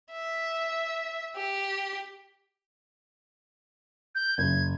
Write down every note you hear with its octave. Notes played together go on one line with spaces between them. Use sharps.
E5
G4
G6
F#1 G#6